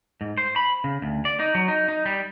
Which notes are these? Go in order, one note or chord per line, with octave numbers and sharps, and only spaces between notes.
G#2
C5
B5
C#3
D2
D5
D#4
F#3
D#4
D#4
G3